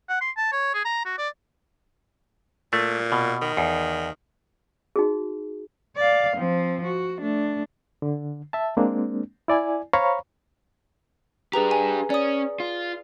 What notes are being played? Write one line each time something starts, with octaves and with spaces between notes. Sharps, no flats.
F#5
C6
A5
C#5
G#4
A#5
F#4
D5
A#2 A3
B2
D#3
E2
D#4 F#4 G#4
D5 F5
F3 C4
F#4
A3 D4
D3
E5 A5
G#3 A#3 C4 D4
E4 D5 G#5
C5 C#5 F5 A#5 B5 C#6
D4 G4 G#4 B4 A#5
G#5
C#4 D5 D#6
F4